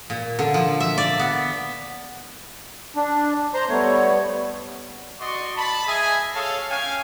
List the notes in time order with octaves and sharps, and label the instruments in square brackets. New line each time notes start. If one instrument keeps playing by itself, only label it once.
[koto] A#2
D3
F3
E5
D5
B3
[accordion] D4
C5 A#5 C6
[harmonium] G3 B3 [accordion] A3 C#5
[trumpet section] F#4 D5 D#5 C6 C#6
A5 B5
G#4 D#5 E5 G#5
G#4 A4 C#5 F5 A5
C#4 F5 G5 G#5